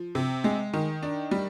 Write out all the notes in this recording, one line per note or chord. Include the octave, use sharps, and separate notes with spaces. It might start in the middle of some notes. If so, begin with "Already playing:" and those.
Already playing: F3
C3
G#3
D#3
D4
G3